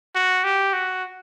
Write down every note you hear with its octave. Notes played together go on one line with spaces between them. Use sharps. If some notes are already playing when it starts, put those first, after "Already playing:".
F#4
G4
F#4